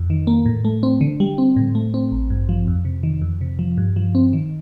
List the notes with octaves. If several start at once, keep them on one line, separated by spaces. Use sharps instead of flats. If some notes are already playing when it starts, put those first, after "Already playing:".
Already playing: F2
D#3
A#3
A2
A3
C4
D3
G3
C4
A2
A3
C4
A1
G2
F3
F2
C3
D#3
F2
C3
F3
G2
F3
C4
D#3